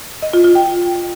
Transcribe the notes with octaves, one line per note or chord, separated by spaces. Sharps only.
D#5
F4
F4
G5